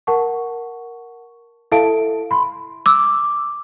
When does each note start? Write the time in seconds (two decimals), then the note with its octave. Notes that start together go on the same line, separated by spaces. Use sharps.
0.07 A#4 F#5 A5 C#6
1.72 E4 A4 E5 F5 A5 D7
2.31 B5 C6
2.86 D6 E6